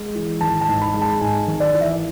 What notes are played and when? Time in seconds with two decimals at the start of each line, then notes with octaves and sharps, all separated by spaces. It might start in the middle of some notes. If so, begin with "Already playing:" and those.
Already playing: G#3
0.15 E3
0.41 G#1 A5
0.61 A5
0.68 G#2
0.82 B5
0.94 G#3
1.02 A5
1.21 G#2 G#5
1.47 G#1
1.60 D5
1.74 E3
1.81 E5